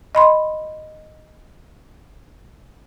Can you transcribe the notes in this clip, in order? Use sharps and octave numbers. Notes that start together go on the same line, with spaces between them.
D#5 B5 C6